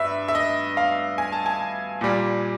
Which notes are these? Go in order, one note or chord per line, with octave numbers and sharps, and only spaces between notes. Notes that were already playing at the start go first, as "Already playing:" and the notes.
Already playing: G2 B4 E5
E5
D#5
F5
G#5
A5
G#5
A#2 G3